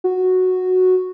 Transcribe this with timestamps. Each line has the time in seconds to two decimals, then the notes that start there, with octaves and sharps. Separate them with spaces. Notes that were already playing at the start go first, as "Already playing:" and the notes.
0.04 F#4